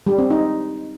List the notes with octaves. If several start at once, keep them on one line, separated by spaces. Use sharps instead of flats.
G3
C4
D#4